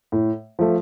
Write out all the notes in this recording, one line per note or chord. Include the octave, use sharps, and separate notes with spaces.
A2
F3 A3